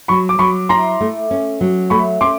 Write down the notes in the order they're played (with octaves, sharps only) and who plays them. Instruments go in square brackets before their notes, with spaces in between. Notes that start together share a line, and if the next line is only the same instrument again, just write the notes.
[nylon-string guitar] F#3 [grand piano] B5 C#6
[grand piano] D6
[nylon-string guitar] F#3 [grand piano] B5 C#6
[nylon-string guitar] E4 [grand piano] A#5 C6
[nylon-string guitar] A3
C#4
F#3
[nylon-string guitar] A3 [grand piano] B5 C#6
[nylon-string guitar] C#4 [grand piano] C6 D6